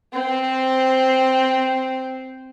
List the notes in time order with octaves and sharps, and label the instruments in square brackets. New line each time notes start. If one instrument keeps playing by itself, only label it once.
[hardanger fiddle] C4 C5